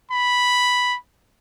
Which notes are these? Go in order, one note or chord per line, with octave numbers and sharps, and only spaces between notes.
B5